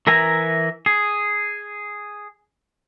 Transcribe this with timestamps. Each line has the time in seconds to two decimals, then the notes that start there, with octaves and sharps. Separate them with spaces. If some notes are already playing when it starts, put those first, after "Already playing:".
0.07 E3 A#4 E5 G#5 A#5
0.86 G#4